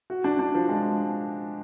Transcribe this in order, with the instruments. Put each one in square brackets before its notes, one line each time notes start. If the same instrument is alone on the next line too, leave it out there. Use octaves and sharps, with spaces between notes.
[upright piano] F#4
D4
D4
F3
G#3